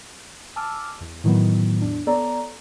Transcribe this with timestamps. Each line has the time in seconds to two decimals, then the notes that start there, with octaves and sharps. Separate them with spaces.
0.56 G#5 A5 D6 E6 F6
1.01 E2
1.24 A2 D#3 E3 F#3 B3
1.81 E2 D4
2.07 B3 A4 C#5 D5 A#5